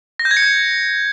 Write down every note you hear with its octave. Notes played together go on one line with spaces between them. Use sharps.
A#6
G6
G#6
C#7
G6